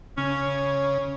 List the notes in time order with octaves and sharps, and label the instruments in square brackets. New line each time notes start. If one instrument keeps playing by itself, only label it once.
[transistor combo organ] C#3 [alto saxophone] C#4